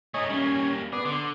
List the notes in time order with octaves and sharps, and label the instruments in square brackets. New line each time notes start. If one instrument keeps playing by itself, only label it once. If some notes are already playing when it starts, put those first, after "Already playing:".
[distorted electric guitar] A3 D#4 [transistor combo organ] C#5 D#5 G#5
[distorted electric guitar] G3 A#3 [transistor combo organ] C#4 G#5
[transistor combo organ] B3 D5 [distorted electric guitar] G#4
[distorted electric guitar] D3 [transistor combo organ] C6 D6